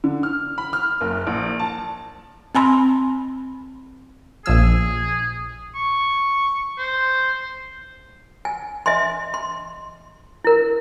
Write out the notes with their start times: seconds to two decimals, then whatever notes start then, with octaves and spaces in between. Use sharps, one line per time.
0.04 D3
0.23 F6
0.58 B5
0.73 F6
1.01 F#1
1.27 A#1
1.60 A5
2.55 C4 G#5 B5 C6
4.46 A#1 F3 G#4 E6
5.75 C#6
6.78 C5
8.45 G#5
8.86 D#5 E5 G#5 C6
9.34 C6
10.44 E4 A#4